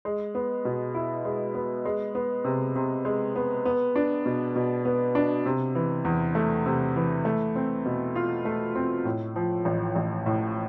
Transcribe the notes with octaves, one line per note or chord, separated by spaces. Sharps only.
G#3
B3
B2
E4
G#3
B3
G#3
B3
C3
C3
G#3
B3
B3
D4
B2
B2
B3
D4
C3
E3
E2
A3
C3
E3
A3
C4
B2
F4
A3
C4
A2
F3
A1
A1
A2